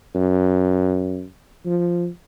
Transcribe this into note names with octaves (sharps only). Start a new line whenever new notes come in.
F#2
F3